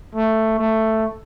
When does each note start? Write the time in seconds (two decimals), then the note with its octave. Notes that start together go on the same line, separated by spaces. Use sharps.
0.15 A3
0.58 A3